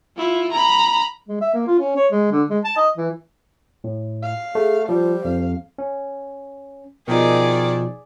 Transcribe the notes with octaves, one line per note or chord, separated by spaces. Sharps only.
E4 F4
A#5 B5
G#3
E5
A#3
F4
C#4
C#5
G#3
D3
G#3
A5
D#5
E3
A2
F5
A3 G#4
F3 G3 C5
F2 F5
C#4
B2 D#3 F3 D#4 G#4 D5